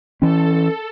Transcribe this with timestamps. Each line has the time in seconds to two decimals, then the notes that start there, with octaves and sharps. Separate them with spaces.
0.21 E3 C#4 A4